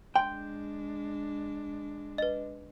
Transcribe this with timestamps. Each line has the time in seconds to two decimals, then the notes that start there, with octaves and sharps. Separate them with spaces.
0.16 G#3 D4 G5 C6
2.18 B4 D#5